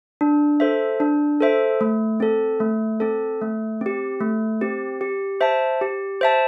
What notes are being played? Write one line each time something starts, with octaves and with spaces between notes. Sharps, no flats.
D4
A4 C5 E5
D4
A4 C5 E5
A3
C4 A4
A3
C4 A4
A3
C4 G4
A3
C4 G4
G4
C5 E5 A5
G4
C5 E5 A5